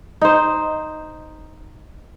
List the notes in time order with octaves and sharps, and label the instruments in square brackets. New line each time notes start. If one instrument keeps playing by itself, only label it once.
[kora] D#4 C5